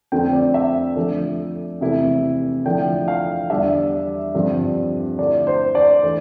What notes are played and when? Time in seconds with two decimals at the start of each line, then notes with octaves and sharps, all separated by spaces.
0.12 F2 D3 A3 C4 F4 G5
0.33 D5
0.54 E5
0.96 D3 F3 A3 D4
1.81 E2 C3 E3 A3 E4
2.66 D3 F3 A3 E4 G5
3.08 F5
3.50 E2 D3 G3 D4 E5
4.34 G2 D3 F3 C4
5.19 D3 A3 E4 D5
5.47 C5
5.75 D5
6.03 E3 A3 D4